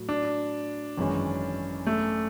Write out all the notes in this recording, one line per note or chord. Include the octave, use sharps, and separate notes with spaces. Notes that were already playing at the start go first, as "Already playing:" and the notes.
Already playing: A2 F#3
D4
G#1 F#2 E3 G#3 C#4
A3